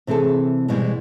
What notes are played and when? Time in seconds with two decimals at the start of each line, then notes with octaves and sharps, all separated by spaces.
0.07 C3 E3 C4 G#4 A4
0.68 G#2 B2 E3 G3 G#3